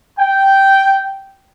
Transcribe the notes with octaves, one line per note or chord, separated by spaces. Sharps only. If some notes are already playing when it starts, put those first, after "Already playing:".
G5